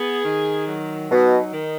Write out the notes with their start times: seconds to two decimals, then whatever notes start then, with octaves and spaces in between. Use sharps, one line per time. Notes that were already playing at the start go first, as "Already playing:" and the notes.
Already playing: B3 G#4
0.25 D#3
0.68 F#3
1.11 B2 D#4
1.53 D#3